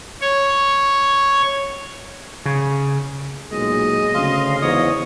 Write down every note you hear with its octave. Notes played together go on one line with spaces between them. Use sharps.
C#5
C#3
B1 A#2 G#3 D#5
D2 C#3 F5 C6
E2 G#2 C#5 D#5 D#6